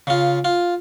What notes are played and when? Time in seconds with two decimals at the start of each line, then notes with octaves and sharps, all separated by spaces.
0.07 C#3 F4
0.45 F4